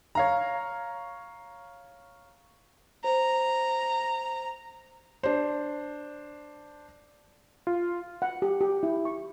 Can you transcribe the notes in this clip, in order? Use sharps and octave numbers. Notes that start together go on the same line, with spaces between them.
C#5 F5 A#5
C5 A#5
D4 C5
F4
F#5
G4
G4
E4
C#6